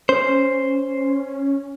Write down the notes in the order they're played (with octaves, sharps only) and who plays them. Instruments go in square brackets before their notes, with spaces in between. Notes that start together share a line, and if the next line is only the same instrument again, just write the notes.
[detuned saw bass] C#4 [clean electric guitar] C5